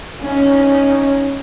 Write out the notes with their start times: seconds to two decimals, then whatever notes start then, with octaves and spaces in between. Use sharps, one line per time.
0.22 C#4 D#4